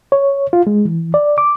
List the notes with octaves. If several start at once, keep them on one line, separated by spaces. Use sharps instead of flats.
C#5
F4
G#3
E3
D5
D6